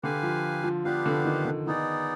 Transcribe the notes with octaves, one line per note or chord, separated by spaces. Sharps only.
D3 G4 B4 F5 G#5
F3
F3
F3 B3 D4 G4 B4 F5
D3
D#3
D3
D#3 B3 D#4 G#4 D5